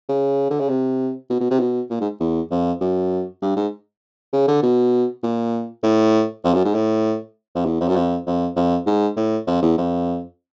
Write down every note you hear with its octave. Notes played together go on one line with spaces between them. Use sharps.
C#3
D3
C#3
C3
B2
B2
C3
B2
A#2
G#2
E2
F2
F#2
G2
G#2
C#3
D3
B2
A#2
A2
F2
F#2
G#2
A2
F2
E2
F2
F#2
F2
F2
F2
G#2
A2
F2
E2
F2